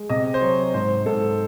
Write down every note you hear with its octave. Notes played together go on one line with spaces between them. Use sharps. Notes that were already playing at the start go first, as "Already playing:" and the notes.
Already playing: G#3
C3 D#5
C5
F#3 C#5
G#2 C5
G#2 A4